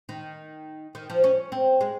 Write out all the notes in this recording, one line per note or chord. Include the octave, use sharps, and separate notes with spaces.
D#3
D#3
F3
C#4
C4
G#3